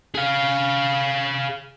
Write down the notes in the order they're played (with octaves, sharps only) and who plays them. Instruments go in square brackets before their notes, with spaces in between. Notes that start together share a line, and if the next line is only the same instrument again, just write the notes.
[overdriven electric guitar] G#4 F5